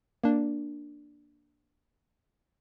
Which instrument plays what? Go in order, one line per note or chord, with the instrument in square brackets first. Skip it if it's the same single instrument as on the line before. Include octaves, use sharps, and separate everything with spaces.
[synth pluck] A#3 D4